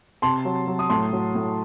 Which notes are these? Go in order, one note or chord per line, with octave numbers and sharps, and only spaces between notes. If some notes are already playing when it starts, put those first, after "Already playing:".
C3 A5 C6
F#3
F#3
D#6
A2 A5 C6
F#3
A2